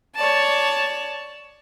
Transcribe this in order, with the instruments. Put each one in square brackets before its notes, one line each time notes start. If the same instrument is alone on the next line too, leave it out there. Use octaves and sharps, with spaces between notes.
[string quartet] C#5 D5 A5